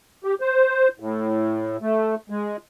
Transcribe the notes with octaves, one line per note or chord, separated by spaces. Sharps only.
G4
C5
A2
A3
G#3